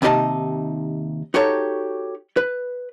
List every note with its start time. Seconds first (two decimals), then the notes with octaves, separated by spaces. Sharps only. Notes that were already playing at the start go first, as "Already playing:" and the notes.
0.02 D#2 C3 D#4 G4 D#5 A5
1.34 D#4 F#4 G4 A4 C#5
2.37 B4